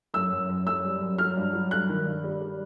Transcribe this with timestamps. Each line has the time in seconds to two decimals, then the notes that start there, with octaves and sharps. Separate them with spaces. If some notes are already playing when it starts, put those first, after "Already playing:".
0.14 F#2 E6
0.32 F#2
0.49 F#2
0.67 F#2 E6
0.84 G3
1.01 F#2
1.18 F#3 F6
1.37 G2
1.53 F#3
1.71 G2 F#6
1.89 D#3
2.06 G2
2.24 G3
2.41 G3